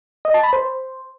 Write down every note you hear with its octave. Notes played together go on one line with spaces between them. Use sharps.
D#5
A5
B5
C5